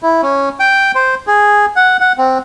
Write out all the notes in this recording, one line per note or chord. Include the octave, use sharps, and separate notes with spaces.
E4
C#4
G5
C5
G#4
F#5
F#5
C4